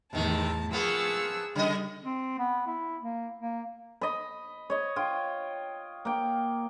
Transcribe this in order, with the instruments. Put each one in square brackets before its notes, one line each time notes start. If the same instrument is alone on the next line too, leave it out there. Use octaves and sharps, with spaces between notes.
[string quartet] E2 A2 A5 [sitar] C3 D#3
[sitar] F3 A#3 B3 [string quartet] G#4 C#6 E6
[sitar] C#3 D#5 [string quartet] G3
[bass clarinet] C4
B3
E4
A#3
A#3
[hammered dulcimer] D#5 B5
C#5 D#5
F4 G5
A#3 G5